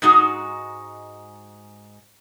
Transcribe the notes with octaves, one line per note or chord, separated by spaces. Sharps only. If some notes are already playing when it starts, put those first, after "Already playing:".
G#2 G#3 D#4 F#4